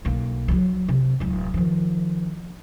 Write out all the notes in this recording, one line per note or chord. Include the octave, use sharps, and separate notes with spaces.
B1 A#3
F#3 G3
C3
D1 G#3
D#3 F3